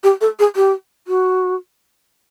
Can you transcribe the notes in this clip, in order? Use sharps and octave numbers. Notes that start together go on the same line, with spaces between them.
G4
A4
G#4
G4
F#4